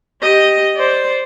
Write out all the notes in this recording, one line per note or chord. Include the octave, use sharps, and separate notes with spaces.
G4 D#5
C5 D5